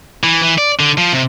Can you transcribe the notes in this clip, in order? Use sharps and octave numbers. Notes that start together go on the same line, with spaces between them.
E3
E3
D5
D3
F3
C3